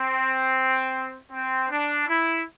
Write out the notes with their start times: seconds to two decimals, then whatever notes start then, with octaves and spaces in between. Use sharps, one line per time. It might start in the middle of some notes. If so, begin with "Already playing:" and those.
Already playing: C4
1.31 C4
1.70 D4
2.08 E4